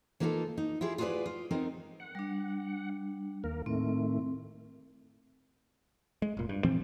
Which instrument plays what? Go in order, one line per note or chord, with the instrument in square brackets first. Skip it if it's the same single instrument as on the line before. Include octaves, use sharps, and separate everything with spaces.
[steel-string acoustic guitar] E3 A#3 D#4 F4 G#4 A4
D#4
E4 F4 G4 G#4
F4 F#4 G#4 A4 B4 D5
F4
G#3 B3 C4 D#4 A#4
[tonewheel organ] F#5
[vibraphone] G3 D4
[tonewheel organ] D#2 A#3 A#4
[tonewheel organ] A2 D#3 A3 [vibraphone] C4
[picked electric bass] G#3
F1 A#2
G2
A#2 E3 F3 C4